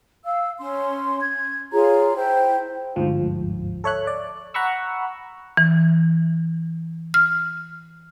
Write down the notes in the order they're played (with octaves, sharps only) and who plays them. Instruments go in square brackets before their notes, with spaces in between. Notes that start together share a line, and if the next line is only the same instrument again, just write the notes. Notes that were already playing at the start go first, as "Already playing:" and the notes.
[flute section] F5 E6
C#4 C6
G#6
F4 G#4 C#5 A#5
E4 C5 G5
[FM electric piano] G1 D2 G#2 F3
A4 C#5 E5 F#6
D5
F#5 A#5 B5 C#6 E6
[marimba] E3
F6